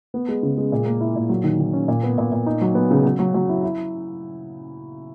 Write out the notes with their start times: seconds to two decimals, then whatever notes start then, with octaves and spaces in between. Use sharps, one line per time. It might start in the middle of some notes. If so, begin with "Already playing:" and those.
0.14 B3
0.28 G#3
0.43 C#3
0.57 G#3
0.72 A#2
0.86 A#3
1.01 E4
1.16 A#2
1.29 F#3
1.44 D#3
1.60 D#3
1.73 C#4
1.88 A#2
2.03 B3
2.18 A#2
2.32 A#2
2.46 D#4
2.62 F#3
2.75 B3
2.91 C#3
3.05 F#3
3.19 F#3
3.34 F#3
3.49 E4
3.63 E4